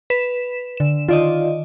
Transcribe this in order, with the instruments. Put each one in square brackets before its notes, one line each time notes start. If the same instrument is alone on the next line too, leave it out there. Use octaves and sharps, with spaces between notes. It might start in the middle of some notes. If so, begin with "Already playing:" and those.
[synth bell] B4 B6 E7
D3 E7
[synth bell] D#3 D5 D#5 [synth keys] F4